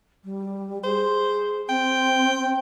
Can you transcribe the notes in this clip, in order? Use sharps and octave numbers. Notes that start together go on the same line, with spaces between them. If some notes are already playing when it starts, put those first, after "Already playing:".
G3
G#4 C5
C4 G5